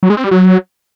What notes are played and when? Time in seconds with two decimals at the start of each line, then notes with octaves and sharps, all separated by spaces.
0.03 F#3
0.10 G#3
0.17 C4
0.24 G3
0.31 F#3